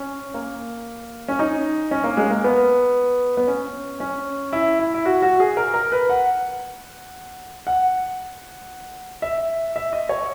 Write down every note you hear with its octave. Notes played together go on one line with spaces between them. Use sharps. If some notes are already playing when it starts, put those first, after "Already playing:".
Already playing: C#4
A#3
C#4
D#4
C#4
A#3
G#3
A#3
B3
B3
C#4
C#4
E4
E4
E4
F#4
F#4
G#4
A#4
A#4
B4
F#5
F#5
E5
E5
D#5
C#5